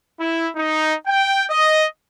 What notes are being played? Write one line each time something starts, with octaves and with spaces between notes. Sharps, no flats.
E4
D#4
G5
D#5